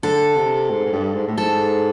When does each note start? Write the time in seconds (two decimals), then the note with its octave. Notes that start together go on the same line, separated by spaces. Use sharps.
0.03 D3 A4
0.36 C3
0.70 G#2
0.85 G#2
0.92 G2
1.14 G#2
1.27 A2
1.38 G#2 A4